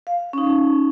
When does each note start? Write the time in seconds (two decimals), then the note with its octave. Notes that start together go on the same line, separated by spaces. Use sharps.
0.07 F5
0.33 C#4 D#4